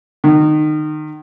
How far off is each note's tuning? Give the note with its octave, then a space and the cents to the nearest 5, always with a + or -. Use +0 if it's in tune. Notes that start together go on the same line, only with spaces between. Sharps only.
D#3 -25